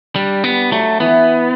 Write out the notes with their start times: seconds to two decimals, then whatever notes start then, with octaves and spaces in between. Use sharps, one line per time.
0.15 G3 D4
0.44 G3 B3
0.72 F#3 A3
1.00 E3 B3